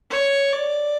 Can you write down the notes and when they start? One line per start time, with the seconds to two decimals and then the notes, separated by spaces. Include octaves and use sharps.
0.10 C#5
0.53 D5